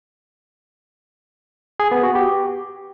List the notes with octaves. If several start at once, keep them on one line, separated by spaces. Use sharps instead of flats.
G#4
B3
F#4
G4